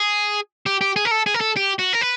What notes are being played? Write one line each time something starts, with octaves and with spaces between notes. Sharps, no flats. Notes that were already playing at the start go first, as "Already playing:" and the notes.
Already playing: G#4
G4
G4
G#4
A#4
A4
G#4
A#4
A4
G4
F#4
A#4
B4